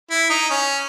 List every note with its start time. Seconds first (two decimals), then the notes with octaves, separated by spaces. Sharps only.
0.11 E4
0.30 D#4
0.50 C#4